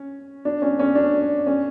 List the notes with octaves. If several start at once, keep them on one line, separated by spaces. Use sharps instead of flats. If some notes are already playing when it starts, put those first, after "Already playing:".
Already playing: C#4
D4
C#4
C#4
D4
C#4